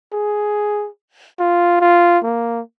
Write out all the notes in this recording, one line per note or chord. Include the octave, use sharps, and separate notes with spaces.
G#4
F4
F4
A#3